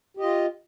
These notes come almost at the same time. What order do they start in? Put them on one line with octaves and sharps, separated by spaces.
G4 D#5 F4